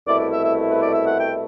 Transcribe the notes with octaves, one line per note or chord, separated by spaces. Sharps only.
C2 B2 A3 E4 D5
D5
E5
E5
B4
D5
E5
F#5
G5